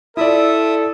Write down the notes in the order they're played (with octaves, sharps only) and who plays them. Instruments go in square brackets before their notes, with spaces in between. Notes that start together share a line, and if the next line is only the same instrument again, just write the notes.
[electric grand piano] E4 F4 D5 [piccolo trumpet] A4 [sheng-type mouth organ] E5 D#6